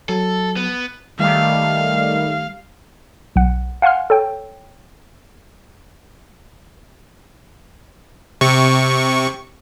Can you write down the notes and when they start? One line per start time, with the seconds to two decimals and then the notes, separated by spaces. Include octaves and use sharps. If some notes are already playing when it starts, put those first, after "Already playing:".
0.09 F#3 A4
0.56 B3
1.19 D#3 G3 A3 F5
3.36 B1 F#5
3.82 F5 F#5 G#5 C6 F6
4.10 A4 C#5 G5
8.41 C3 C#6